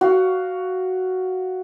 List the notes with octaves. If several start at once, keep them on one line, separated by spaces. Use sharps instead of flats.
F#4 F5